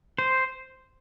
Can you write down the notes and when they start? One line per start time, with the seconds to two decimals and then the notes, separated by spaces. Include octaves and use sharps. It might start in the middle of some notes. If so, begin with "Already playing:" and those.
0.19 C5